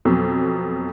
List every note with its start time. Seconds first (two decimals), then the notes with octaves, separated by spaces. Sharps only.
0.05 F2 B2 F#3